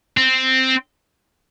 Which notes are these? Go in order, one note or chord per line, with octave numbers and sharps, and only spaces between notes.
C4